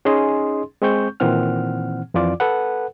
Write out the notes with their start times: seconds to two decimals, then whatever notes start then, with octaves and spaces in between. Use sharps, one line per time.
0.05 C#4 D#4 G#4 D#5 C6
0.82 G#3 C4 C#6 G6
1.20 A#2 D#3 E3 C4 F#5 F6
2.14 F2 E3 F4 D5 D6
2.40 A4 B4 F#5